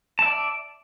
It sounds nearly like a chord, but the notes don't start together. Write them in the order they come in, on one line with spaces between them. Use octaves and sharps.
A5 E5 D5